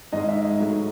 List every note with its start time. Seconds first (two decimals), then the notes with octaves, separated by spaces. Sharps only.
0.13 G#2 D#3 G#3 D#5
0.29 E5
0.45 D#5
0.60 A2 F#3 A3 F#4